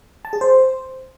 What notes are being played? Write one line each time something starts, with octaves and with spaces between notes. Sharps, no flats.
A5
G#4
C5